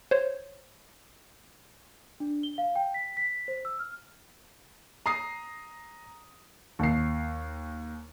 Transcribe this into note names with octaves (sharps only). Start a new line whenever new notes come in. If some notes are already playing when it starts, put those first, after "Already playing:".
C5 C#5
D4
G7
F5
G5
B6
B6
C5
E6
F6
A#5 D#6 C7
D#2 C7